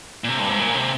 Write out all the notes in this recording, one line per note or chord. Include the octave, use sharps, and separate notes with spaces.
A#2
C3
G2
G#2
A#2
C3